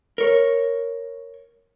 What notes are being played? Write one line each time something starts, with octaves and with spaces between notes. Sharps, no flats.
A#4 C#5